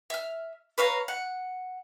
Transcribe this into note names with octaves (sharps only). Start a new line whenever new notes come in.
E5 F6
B4 C#5 F5 A#5
F#5